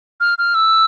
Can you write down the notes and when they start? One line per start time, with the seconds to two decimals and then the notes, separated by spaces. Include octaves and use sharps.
0.20 F6
0.38 F6
0.55 E6